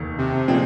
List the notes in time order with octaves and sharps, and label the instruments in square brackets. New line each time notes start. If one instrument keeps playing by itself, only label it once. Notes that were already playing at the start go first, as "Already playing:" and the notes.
Already playing: [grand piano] F1 D#2 D#3
[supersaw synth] C3
[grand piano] A#2 F3 G#3 C4